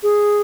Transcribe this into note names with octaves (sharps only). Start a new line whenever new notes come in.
G#4